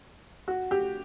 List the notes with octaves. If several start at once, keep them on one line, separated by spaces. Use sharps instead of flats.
F#4
G4